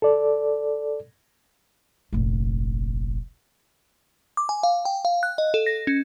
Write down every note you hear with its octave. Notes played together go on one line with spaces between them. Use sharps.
A4 D5
F1 A#1
D6
G#5
F5
G5
F5
F#6
D#5
A4
A#6
C#4